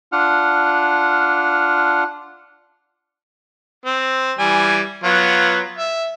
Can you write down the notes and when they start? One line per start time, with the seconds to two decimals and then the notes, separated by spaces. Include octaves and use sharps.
0.12 D4 F4 F#5 F6
3.85 C4
4.39 E3 G3 G#5
5.04 F#3 B3 F4
5.78 E5